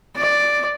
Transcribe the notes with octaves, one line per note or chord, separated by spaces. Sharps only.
D5